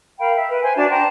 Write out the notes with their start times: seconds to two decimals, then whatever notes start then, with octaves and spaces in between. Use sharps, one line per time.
0.20 A#4 F5 G5 B5
0.38 E5
0.50 B4
0.63 C5 G#5
0.76 D4 F#4 A5
0.90 G5 A5 A#5 C6